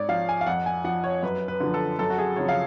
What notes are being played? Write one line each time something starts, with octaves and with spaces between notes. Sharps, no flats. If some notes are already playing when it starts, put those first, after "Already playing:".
Already playing: G#2 C#5 D5
F3 F5
G#5
F5
F2 F#5
G#5
F3 F#5
C#5
F#2 B4
B4
D3 F3
A4
F#2 A4
F#4
G#4
C#3 F3 C#5
F5